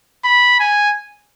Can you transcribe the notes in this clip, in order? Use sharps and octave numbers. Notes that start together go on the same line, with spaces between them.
B5
G#5